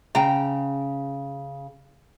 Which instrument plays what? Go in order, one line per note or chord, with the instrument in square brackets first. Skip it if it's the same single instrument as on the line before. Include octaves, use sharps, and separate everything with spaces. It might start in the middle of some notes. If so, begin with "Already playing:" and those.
[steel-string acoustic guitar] C#3 [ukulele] G5 A#5